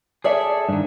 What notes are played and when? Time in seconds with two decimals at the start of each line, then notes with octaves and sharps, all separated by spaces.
0.24 G#4 A4 C#5 D5 E5
0.69 G2 D#3